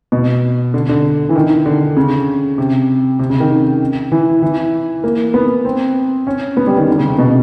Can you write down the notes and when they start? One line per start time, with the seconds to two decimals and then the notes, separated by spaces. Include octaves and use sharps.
0.12 B2
0.74 D3
0.89 D3
1.29 E3
1.36 D#3
1.66 D3
1.97 C#3
2.58 C3
3.19 C3
3.30 C#3
3.40 D#3
4.12 E3
4.42 E3
5.04 A#3
5.34 B3
5.65 C4
6.27 C#4
6.57 B3
6.67 G3
6.77 D#3
6.88 D3
6.98 C#3
7.08 C3
7.19 B2